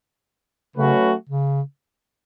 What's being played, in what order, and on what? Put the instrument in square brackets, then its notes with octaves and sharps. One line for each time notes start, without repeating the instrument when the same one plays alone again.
[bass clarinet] C#3 [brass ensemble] F#3 A3 C#4 F#4 B4
[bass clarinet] C#3